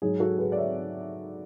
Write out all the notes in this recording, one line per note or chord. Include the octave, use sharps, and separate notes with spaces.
G#2 F#3 G#4
F#4 A4
G#4 B4
D5
C#5 E5